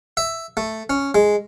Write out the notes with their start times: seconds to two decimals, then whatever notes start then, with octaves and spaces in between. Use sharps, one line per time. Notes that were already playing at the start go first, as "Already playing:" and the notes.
0.17 E5
0.57 A3
0.90 C#4
1.15 G#3